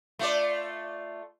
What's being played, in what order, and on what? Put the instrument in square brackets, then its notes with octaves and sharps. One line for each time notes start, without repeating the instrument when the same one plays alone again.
[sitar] A3 F4 D5